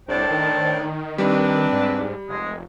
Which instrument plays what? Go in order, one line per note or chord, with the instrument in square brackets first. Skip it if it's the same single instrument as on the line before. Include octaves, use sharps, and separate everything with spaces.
[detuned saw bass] C2 [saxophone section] A2 D4 [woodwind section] C5 G5 A5
[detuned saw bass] D#3
[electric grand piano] G3 [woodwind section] C4 B4 [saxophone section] D4
[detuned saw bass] G#2
[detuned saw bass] F1 [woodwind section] G#3